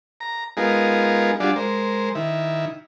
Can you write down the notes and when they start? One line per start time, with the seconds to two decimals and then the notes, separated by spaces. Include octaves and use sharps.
0.20 A#5
0.57 G#3 B3 D#4 F4 G#4 A#4
1.40 G3 D4 F4 F#4 G#4 D5
1.56 G#3 A#4 C5
2.15 D#3 E4